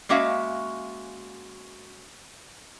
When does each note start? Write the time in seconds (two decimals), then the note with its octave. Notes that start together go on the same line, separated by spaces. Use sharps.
0.09 G#3 A#3 C#4 F#4 E5 F5